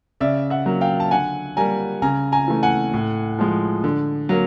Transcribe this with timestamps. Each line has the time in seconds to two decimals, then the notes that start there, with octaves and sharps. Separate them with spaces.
0.20 C#3 D5 E5
0.50 E5 F#5
0.66 F#3 A#3
0.81 F5 G5
1.00 A5
1.11 D3 F#5 G#5
1.57 G3 A#3 G#5 A#5
2.02 C#3 G#5 A#5
2.32 G#5 A#5
2.48 E3 A3
2.63 F#5 G#5
2.94 A2
3.39 F3 G#3
3.84 D3
4.29 F#3 A#3